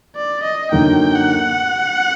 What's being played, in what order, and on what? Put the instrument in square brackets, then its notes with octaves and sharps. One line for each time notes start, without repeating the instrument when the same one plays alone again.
[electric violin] D5
D#5
[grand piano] F#2 D3 F#3 A#3 D#4 [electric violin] G5
[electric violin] F#5